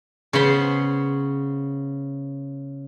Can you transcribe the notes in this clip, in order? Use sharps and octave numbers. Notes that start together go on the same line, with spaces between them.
C#3 B3 C5 B5 C6